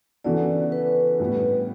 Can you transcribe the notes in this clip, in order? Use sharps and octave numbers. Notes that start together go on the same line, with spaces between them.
C#3 E3 B3 F#4 A4 D5
B4
A2 G3 B3